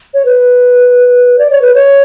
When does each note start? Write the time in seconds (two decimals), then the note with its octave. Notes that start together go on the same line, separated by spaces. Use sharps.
0.14 C#5
0.25 B4
1.39 D5
1.51 C#5
1.62 B4
1.74 C#5